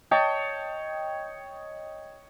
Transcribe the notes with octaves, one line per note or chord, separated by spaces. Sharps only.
C#5 D#5 G5 A5